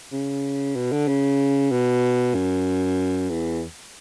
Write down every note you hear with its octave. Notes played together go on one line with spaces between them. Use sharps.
C#3
B2
D3
C#3
B2
F#2
E2